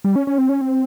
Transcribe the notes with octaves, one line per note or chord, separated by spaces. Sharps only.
G3
C#4
C#4
C4
C#4
C4